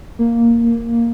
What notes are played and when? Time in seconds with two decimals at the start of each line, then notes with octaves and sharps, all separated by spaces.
0.19 A#3